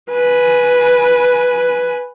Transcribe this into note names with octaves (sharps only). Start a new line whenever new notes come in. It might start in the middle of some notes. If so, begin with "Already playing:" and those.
B4 G#5